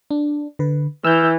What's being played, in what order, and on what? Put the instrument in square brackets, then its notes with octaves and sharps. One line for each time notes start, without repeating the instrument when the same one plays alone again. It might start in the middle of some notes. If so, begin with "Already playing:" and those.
[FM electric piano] D4
D3 B4
[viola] E3 [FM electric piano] E6 F6 G6